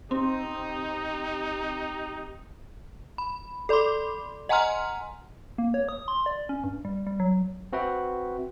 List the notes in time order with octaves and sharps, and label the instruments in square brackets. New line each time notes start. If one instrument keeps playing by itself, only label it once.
[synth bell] C4 [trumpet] D#4 [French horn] G4
[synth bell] B5
A4 D5 B5 C6 D6
D#5 F#5 G#5 A#5 C6 F6
[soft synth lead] A#3
C#5
D#6
C6
D5
C#4
G2
G3
G3
F#3
[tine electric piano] C4 F#4 B4 E5 G5